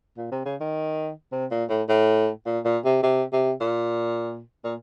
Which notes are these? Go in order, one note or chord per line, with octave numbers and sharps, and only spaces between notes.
A#2
C3
C#3
D#3
C3
A#2
A2
A2
A#2
A#2
C3
C3
C3
A#2
A#2